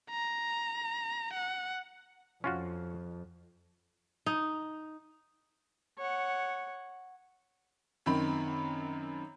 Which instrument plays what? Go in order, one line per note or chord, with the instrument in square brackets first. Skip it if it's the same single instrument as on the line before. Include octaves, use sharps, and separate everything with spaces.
[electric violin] A#5
F#5
[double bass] F2 [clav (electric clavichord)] C#4 F4 F#4
[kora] D#4
[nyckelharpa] C#5 F#5
[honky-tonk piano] F#2 D#3 C4 B5